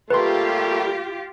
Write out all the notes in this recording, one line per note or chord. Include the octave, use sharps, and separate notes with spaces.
G3 A3 A#3 F4 G4 B4 C6